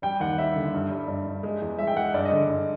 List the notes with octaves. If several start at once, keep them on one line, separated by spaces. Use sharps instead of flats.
G3 G5
D#2 F#5
G3 E5
D3
G2
G3
G2
G2
G#3
E2
G#3 E5
G5
G#3 F#5
G2 D5
D#5
D3
G2